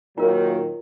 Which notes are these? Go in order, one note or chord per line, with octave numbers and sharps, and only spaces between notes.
A#2 D#3 F#3 F4 A#4